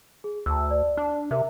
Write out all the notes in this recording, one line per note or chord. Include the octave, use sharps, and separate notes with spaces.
G#4
D2 A5 E6
D5
D4
C3 A#4 E5